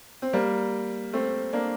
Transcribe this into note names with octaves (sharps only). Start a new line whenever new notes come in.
C4
G3 A#3
A3 C4
A#3 D4